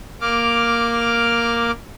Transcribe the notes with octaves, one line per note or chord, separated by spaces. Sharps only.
A#3 D6 F6